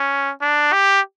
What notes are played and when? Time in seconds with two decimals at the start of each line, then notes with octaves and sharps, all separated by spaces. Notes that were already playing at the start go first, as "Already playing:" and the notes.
Already playing: C#4
0.41 D4
0.73 G4